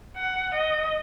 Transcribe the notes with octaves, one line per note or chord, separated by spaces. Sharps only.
F#5
D#5